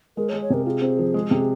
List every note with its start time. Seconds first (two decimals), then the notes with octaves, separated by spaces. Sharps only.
0.17 G#3 A#4
0.29 C#5
0.33 G#3
0.42 C#5
0.50 C3 A#4
0.66 F4 G#4
0.82 C4
0.99 F3
1.14 G#3
1.31 C3